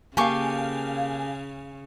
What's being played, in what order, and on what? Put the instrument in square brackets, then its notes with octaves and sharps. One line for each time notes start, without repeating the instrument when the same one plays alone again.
[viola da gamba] C#3 [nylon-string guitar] A#3 [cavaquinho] G4 A4 C#6 [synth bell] F5 G#5